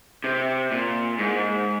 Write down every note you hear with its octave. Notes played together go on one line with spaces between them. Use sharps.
C3
A#2
G#2